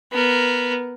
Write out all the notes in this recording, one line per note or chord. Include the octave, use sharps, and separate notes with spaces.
B3 A#4